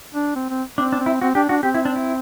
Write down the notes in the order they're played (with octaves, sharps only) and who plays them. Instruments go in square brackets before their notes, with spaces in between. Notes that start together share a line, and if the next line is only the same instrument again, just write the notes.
[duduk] D4
C4
C4
[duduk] C4 [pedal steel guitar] D4
[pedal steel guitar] D4
[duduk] C4
[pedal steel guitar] E4
[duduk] C4 [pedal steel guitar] F#4
[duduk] D4 [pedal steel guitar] G4
[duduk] D4 [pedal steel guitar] F#4
[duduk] C4 [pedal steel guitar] G4
[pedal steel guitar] E4
D4
E4